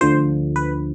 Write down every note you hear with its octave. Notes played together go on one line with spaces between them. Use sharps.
D2 D3 F3 C5
B4